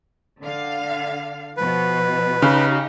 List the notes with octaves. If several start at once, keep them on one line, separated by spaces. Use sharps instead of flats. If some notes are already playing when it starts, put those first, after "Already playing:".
D3 F5
B2 F3 B4
C#3 D#4 G4